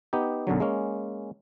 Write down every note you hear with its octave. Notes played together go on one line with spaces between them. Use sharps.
B3 D#4 G4
B1 F#2 D3 F#3
G#3 A#3 C#4